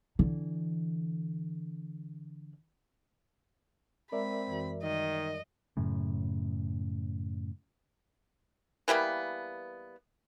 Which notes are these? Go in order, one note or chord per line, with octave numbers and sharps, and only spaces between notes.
D3 E3
G#3 C4 A#4 D5 E5 B5
F#2 E3 F#4
D#3 G3 D#5
F#2 A2 C#3
E3 G3 A#3 B3